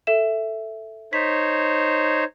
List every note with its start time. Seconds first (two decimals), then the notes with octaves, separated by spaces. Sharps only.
0.07 A4 E5 E7
1.13 D#4 C5 C#5 B6